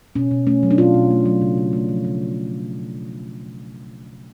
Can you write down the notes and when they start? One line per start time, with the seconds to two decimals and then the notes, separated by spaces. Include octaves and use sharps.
0.16 B2 C#4
0.31 B2
0.47 A3 C#4
0.63 F#3
0.71 D4
0.78 B2 F4
0.94 B2
1.11 A3
1.26 F#3
1.41 C#3
1.58 C#3
1.73 A3
1.89 F3
2.05 C#3